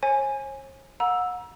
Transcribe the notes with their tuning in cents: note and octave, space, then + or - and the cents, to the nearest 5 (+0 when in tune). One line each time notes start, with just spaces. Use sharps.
C#5 -45 G#5 +0
F#5 -35 A#5 +30 E6 +0